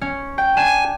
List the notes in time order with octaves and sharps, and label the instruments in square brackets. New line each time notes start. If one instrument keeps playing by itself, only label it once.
[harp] C#4
G5
[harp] D4 E7 [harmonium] G#5